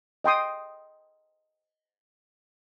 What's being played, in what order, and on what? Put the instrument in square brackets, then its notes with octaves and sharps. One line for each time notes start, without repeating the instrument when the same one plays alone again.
[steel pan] D#5 G5 C6 D#6